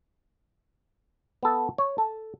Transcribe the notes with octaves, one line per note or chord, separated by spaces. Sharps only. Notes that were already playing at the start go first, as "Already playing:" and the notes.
B3 A4
C#5
A4